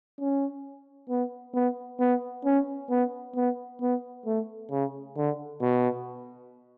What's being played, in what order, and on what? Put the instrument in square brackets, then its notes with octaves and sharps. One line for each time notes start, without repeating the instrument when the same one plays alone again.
[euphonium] C#4
B3
B3
B3
C#4
B3
B3
B3
A3
C#3
D3
B2